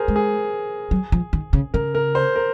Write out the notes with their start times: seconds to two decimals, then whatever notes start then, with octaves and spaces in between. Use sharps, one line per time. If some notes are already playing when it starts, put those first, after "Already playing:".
Already playing: G#4 A#4 C5
0.08 G#3
0.16 G#4
0.91 F#3
1.12 F3
1.33 D#3
1.53 C#3
1.74 C#3 A#4
1.95 A#4
2.15 C5
2.36 A#4